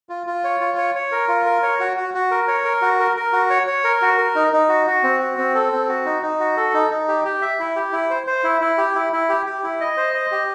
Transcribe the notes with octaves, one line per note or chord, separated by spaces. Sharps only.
F4
F4
C#5
F4
C#5
C#5
A#4
F4
A#4
C#5
F#4
F#4
F#4
A#4
C#5
A#4
F#4
A#4
A#4
F#4
C#5
C#5
A#4
F#4
A#4
D#4
D#4
F#4
F#4
C4
F#4
C4
A4
C4
F#4
D#4
D#4
F#4
A4
D#4
D#4
G4
G4
E5
E4
G4
E4
C5
C5
E4
E4
G4
E4
E4
G4
G4
E4
D#5
C5
D#5
G4